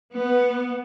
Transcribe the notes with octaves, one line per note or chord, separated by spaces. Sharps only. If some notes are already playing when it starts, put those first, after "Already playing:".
B3